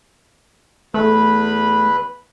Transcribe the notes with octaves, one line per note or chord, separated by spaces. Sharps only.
E2 A3 B4 B5